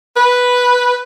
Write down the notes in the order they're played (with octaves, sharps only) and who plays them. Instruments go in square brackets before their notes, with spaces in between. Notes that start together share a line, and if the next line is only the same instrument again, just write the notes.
[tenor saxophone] B4